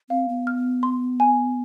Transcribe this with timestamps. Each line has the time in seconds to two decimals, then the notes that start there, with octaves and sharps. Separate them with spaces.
0.10 C4 F5
0.29 B3
0.47 F6
0.83 C6
1.20 G#5